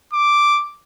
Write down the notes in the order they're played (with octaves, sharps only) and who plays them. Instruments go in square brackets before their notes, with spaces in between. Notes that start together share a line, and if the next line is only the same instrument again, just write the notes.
[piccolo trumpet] D6